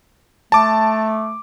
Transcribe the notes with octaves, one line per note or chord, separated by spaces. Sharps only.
A3 A5 D6